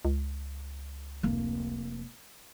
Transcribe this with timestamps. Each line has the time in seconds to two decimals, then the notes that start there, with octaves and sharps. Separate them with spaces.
0.05 C#2
1.23 F1 A#3